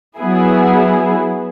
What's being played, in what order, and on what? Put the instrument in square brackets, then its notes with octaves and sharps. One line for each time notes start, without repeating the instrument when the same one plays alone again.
[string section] F#3 B3 E4 G#4